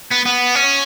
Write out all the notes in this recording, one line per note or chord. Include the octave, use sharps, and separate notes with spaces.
B3
B3
C#4